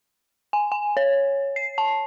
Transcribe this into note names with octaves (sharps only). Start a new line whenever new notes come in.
G#5
G#5
C#5
C7
A5